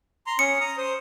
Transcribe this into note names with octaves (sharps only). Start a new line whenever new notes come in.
A#5 C6
C#4 D#6 C#7
A#5 D#6
C5 D#6